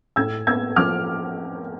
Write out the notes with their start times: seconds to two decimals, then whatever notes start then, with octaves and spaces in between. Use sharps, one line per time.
0.16 A2 E6 G#6
0.47 B3 E6 G#6
0.76 F3 D6 F6